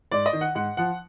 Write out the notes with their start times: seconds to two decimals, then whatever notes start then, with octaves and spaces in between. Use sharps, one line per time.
0.11 G#2 D5
0.26 D#5
0.33 D#3
0.41 F#5
0.55 G#2 F#5
0.77 F3 F#5